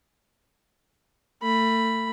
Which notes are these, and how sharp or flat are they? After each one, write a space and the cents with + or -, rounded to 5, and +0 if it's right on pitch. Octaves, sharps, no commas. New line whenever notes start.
A3 +35 B5 +0